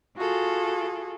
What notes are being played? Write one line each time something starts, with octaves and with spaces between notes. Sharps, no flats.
F4 F#4 G#4 A4